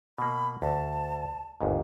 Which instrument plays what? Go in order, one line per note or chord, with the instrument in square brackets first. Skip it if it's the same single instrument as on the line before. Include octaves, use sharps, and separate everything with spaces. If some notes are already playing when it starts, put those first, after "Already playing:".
[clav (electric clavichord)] B2 A#3 [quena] B5
[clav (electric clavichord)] D2 [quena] A5
[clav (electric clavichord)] G1 D#2 G#2